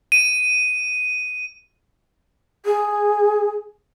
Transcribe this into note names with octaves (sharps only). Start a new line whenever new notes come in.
D#7
G#4